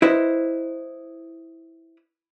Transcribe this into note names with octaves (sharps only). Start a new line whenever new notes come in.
E4 B4 C5 D#5